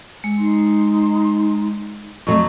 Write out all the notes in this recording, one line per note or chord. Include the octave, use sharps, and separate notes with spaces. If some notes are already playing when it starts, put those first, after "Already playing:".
G#3
D#4 C6
F2 F#3 A3 C#6